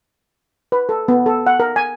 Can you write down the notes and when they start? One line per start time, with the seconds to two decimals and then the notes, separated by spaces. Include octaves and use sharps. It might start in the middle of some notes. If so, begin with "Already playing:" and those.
0.72 B4
0.89 A4
1.08 B3
1.26 A4
1.47 F#5
1.60 A#4
1.76 G#5